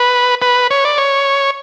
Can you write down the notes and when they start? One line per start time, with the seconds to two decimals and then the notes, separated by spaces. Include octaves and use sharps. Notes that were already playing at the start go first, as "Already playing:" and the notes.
Already playing: B4
0.42 B4
0.71 C#5
0.85 D5
0.98 C#5